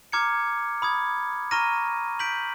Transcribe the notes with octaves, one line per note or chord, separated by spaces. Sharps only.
A#5 D6 F6 G#6 C#7
B5 D#6 G#6
A#5 C#6 F6 A#6 D#7
G6 B6 D7 F#7